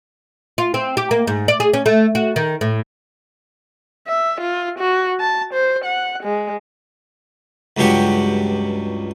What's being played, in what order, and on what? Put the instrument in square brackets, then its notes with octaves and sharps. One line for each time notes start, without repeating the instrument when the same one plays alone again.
[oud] F4
C4
G4
A#3
G#2
D5
G#4
C#4
A3
F#4
D#3
A2
[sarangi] E5
F4
F#4
A5
C5
F#5
G#3
[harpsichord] C#2 G2 F#3 G4 C#6